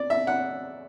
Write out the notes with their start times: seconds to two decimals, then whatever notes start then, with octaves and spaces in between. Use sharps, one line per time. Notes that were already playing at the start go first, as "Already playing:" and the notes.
Already playing: D5
0.10 E5
0.27 F#5